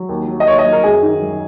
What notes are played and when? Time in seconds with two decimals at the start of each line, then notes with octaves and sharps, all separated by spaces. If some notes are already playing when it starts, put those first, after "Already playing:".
Already playing: F#3
0.09 D#2
0.28 F#3
0.40 D#5
0.46 D#2 C#5
0.59 D#5
0.65 F#3
0.72 A#4
0.84 F#2 G#4
1.03 D#3
1.22 F#2